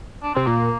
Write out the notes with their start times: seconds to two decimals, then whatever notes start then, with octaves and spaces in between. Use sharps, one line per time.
0.23 D4
0.35 C3 C4
0.46 A#2 A#3